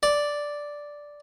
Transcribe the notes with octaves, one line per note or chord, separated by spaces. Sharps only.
D5